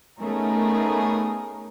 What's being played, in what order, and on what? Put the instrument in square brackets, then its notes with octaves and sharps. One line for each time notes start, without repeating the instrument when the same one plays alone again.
[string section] A3 B3 C#4 D#4 G#4 A#4